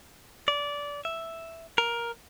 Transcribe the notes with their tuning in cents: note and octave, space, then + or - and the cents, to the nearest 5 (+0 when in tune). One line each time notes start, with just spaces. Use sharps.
D5 -20
E5 +0
A#4 +10